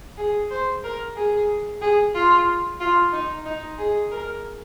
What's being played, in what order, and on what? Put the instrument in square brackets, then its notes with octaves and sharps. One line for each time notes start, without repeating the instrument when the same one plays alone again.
[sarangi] G#4
C5
A#4
G#4
G#4
F4
F4
D#4
D#4
G#4
A#4